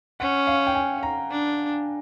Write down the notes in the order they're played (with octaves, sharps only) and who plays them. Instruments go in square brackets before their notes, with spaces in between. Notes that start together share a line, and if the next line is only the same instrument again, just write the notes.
[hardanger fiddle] C#4 [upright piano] F#5
[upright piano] F5
G5
G#5
A#5
[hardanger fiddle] D4